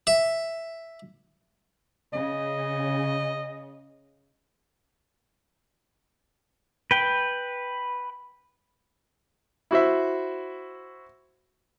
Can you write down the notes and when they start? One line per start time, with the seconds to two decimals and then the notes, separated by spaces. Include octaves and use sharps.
0.07 E5
2.13 C#3 D#5
6.91 B4 G5
9.71 E4 F#4 C5 E5